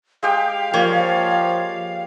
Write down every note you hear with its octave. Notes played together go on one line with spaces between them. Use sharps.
G#3 G4 F5 G5
F3 A#3 C#5 D5